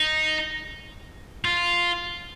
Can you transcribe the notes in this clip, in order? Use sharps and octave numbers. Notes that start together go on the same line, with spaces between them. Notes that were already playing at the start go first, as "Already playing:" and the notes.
Already playing: D#4
F4